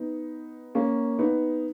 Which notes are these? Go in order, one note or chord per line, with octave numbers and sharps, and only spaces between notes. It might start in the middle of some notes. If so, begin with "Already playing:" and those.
Already playing: B3 D#4
A#3 C#4
B3 D#4